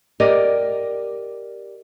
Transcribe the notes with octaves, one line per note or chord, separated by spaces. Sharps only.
G4 A#4 D5 D#5